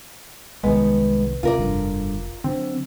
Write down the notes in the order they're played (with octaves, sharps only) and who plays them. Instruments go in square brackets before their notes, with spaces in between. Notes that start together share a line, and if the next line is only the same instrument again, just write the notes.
[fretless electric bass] C2 D#3 [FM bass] G#3 [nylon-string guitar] B3
[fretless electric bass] D2 C3 [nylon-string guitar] F4 A#4 D5
[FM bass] F1 [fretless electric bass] G2 D3
[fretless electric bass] D3 D#3 F#3 [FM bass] C4